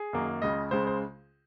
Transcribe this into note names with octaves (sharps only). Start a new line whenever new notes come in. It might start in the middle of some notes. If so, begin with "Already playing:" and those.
Already playing: G#4
F#2 D#3 A#3
C#2 C#3 G#3 D#5
C#2 C#3 G#3 C5
C5